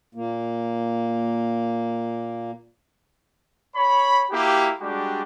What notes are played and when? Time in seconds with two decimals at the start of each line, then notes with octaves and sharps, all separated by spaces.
0.15 A#2 A#3
3.76 C#5 B5
4.31 A#3 E4 F#4 G4
4.81 G3 G#3 D4 F#4 G4